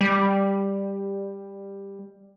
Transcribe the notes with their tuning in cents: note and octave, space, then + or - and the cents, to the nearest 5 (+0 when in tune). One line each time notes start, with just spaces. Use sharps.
G3 +10